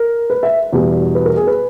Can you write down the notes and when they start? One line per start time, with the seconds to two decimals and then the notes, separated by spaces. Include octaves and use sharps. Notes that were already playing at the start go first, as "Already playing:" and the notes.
Already playing: A#4
0.30 B4
0.43 E5
0.73 E2 B2 G3
1.15 B4
1.26 A#4
1.36 G#4
1.47 B4